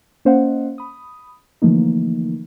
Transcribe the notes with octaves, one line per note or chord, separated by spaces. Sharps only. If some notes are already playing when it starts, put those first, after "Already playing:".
A#3 C#4 C5 D#5 F5 F#5
B5 D#6
D3 E3 F3 A3 A#3 D#4